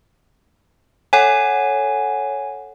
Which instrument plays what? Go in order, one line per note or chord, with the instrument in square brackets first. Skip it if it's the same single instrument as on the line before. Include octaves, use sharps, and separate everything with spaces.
[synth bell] A4 C#5 F#5 [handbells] G#5